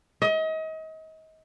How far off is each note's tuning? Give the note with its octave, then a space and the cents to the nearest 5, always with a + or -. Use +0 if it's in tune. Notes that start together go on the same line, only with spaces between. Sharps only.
D#5 +35